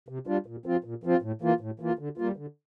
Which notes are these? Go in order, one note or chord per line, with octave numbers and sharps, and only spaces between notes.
C3
G3 D4 F4
A#2
F3 C4 F4
A#2
F3 C4 F4
A2
E3 A#3 F4
A2
E3 A#3 F4
D3
G3 A#3 F4
D3